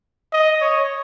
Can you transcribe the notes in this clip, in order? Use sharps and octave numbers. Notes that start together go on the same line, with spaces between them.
D#5
C#5